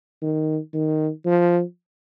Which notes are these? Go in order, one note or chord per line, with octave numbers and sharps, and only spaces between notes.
D#3
D#3
F3